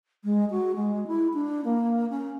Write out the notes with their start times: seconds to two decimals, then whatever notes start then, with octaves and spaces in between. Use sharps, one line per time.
0.24 G#3
0.51 F#4
0.76 G#3
1.07 E4
1.34 D4
1.65 A#3
2.10 C#4